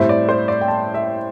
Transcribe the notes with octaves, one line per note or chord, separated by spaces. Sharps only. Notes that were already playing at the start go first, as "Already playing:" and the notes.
Already playing: A2 G3 C4 E5
D5
C5
D5
G5
A5
E5